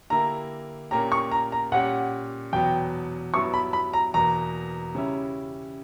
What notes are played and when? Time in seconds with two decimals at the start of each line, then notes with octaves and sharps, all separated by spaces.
0.10 D3 A#3 E4 G4 A#5
0.91 A#2 A#3 C#4 G4 A#5
1.12 C#6
1.31 A#5
1.52 A#5
1.72 A#2 G3 C#4 G4 F#5
2.53 E2 B2 F#3 B3 G5
3.34 G2 F#3 B3 E4 C#6
3.54 B5
3.73 B5
3.93 A#5
4.14 E2 B2 A#3 A#5
4.95 C#3 G3 C#4 E4 G4